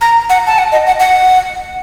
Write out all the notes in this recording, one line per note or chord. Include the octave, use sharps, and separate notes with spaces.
A#5
F#5
A5
F#5
D#5
F#5
F#5